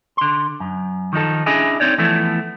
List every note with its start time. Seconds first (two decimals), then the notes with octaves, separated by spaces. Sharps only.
0.17 D3 C6
0.60 F#2
1.13 D#3 F3 D#4 A4
1.46 C#4 D4 E4 G#4 D#5 G#5
1.80 C4 D#4 C#5 D5
1.98 E3 F3 A3 B3 E4 A4